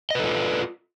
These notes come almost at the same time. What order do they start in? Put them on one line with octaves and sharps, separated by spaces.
D#5 B4 A4 F4